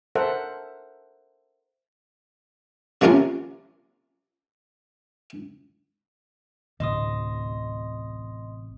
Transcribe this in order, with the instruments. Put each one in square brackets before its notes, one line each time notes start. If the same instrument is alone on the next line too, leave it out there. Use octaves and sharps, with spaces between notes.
[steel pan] A4 A#4 C5 E5 F#5
[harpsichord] C3 F3 A#3 C#4 F4 A#4
[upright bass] A1 C3 [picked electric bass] D2 [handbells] D#5 C6 D#6